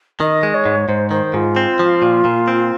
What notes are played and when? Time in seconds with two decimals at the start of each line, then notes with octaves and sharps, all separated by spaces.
0.20 D#3 D#5
0.43 G#3
0.54 C#5
0.65 G#2
0.88 G#2 C5
1.11 D#3 C5
1.34 G#2 F4
1.56 C4
1.79 F3
2.02 A#2
2.25 A#2
2.48 C4